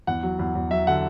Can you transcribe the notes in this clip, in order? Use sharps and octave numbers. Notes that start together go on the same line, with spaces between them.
E2 F#5
F#3
E2
E2
F#3 E5
D3 F#5